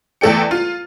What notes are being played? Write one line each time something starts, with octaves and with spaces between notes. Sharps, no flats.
E2 A3 A4 D5 G5 C#7
F4